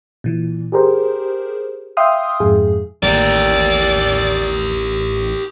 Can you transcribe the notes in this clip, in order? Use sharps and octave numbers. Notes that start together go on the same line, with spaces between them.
A#2 E3
G4 G#4 A#4 C5
E5 F5 G5 C6 D#6 F6
F2 G#2 G#4
A1 D#2 G4 A#4 D5